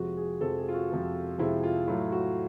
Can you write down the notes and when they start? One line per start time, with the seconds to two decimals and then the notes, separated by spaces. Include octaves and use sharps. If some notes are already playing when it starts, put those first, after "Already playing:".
Already playing: F2 C3 F3 G#3 F#4
0.17 G#4
0.40 F2 C3 F3 G#3 A4
0.58 G#4
0.69 F4
0.74 F#4
0.90 F2 C3 F3 G#3
1.38 F2 C3 F3 G#3 E4
1.64 F4
1.88 A2 F#3 A3 F4
2.12 F#4